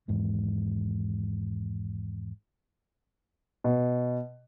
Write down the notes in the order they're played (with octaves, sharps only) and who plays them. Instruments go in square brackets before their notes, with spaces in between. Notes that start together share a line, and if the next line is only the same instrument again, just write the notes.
[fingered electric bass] G#1 E2 G#2
[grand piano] B2